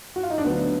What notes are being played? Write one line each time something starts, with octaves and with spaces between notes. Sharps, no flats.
F#4
F4
D#4
D4
D2 D3 F#3 B3